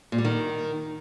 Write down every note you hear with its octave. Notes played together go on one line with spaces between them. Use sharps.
A#2
G3
D#3